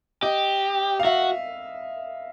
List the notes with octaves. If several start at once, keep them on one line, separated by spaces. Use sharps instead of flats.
G4 D#5
F5
F#4 E5